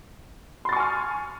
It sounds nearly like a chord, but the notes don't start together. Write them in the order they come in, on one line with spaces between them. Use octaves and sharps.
C6 A6 C#6 G#5 F6